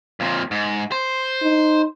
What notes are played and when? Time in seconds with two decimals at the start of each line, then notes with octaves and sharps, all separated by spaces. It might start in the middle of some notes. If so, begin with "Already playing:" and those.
0.20 F2 A#2
0.51 G#2
0.92 C5
1.43 D#4